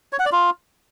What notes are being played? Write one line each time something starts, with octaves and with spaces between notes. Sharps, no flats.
C#5
F#5
D5
F4